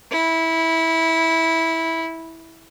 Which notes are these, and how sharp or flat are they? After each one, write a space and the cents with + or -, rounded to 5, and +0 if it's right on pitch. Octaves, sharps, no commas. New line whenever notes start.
E4 -15